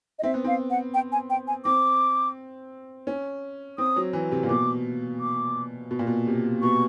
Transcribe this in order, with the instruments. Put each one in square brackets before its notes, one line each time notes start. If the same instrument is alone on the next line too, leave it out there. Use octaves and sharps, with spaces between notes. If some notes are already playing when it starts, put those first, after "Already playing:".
[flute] D#5
[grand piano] C4 [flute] E5
[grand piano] B3
[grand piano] C4 [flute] F5
[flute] F#5
G5
G#5
G5
G#5
[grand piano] C4 [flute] D6
[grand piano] C#4
[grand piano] C4 [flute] D#6
[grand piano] F#3
E3
C3
A#2
[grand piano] B2 [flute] D6
[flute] D6
[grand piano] B2
A#2
B2
C3
[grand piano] B2 [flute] C#6